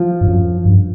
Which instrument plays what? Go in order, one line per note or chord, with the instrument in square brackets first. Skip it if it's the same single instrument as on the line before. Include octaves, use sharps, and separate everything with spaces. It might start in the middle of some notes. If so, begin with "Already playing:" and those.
Already playing: [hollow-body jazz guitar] F3
[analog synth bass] G2
F#2
G2